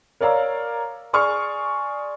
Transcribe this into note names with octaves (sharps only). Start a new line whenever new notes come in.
A#4 C#5 D5 F5 A#5 E6
G#4 D5 C6 C#6 D#6 F6